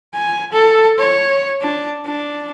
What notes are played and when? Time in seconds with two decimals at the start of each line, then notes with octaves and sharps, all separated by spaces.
0.14 G#5
0.52 A4
0.98 C#5
1.61 D4
2.06 D4